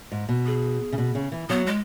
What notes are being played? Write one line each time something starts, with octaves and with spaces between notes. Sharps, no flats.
G#2
B2
G#4
C#3
B2
C#3
E3
F#3 B3
G#3